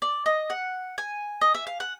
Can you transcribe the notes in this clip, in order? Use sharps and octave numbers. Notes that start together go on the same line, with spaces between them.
D5
D#5
F#5
G#5
D#5
E5
F5
F#5